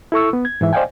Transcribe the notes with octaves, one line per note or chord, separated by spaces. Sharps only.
E4 A4 C#6 E6
B3
G#6
G#2 E3 E5
C5 D5 D#5 F5 G5 G#5